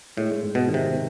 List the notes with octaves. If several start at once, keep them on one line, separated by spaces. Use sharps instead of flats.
A2 G#3
G#2
B2
D#3
C3
C4